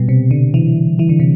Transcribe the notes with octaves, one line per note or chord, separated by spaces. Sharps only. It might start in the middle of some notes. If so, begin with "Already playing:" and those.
Already playing: B2 G3
C3
D3
E3
E3
D3
C3